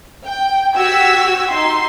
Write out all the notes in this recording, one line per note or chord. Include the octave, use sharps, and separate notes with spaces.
G5
F#4 G4 E6 G#6 B6
D#4 C6